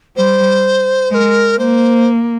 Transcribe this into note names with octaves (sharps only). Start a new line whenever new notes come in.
G3 C5
G#3 A#4 C5
A#3 C5